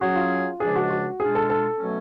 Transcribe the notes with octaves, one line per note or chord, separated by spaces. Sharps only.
F#3 C#4 F#4 G#4
F4
C#2 C#3 F3 G#3 D4 G#4
F#4
F#4
B2 G#3 D4 F4 G#4
A4
A4
B2 F#3 A3 C#4